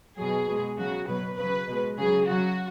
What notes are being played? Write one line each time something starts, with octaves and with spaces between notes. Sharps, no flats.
B2 F#3 G#4
B2 G#3
C#3 F#3 F#4
B2 F#3 B4
C#3 F#3 B4
B2 G#3
C#3 F#3 G#4
C#3 F#3 F#4